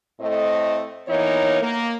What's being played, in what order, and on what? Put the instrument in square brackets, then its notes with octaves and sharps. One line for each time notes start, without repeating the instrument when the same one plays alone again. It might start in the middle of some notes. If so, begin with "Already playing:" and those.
[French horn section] A2 A3 C4 D#5
E3 A#3 B3 D#4 C#5
A#3